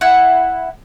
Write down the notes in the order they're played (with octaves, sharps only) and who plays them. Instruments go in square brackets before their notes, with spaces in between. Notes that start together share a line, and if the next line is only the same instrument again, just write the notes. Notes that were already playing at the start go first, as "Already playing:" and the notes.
[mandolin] E4 F#5